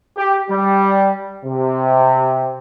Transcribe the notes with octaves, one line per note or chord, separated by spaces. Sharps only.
G4
G3
C3